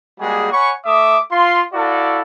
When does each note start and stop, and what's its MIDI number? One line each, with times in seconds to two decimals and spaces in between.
0.20 0.48 55
0.20 0.48 56
0.20 0.48 58
0.20 0.48 66
0.20 0.48 68
0.52 0.72 73
0.52 0.72 78
0.52 0.72 80
0.52 0.72 83
0.52 0.72 85
0.85 1.18 57
0.85 1.18 76
0.85 1.18 86
0.85 1.18 87
1.31 1.61 65
1.31 1.61 84
1.74 2.21 64
1.74 2.21 66
1.74 2.21 69
1.74 2.21 74
1.74 2.21 77